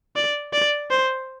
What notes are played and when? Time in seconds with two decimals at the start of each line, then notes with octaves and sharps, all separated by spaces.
0.16 D5
0.53 D5
0.90 C5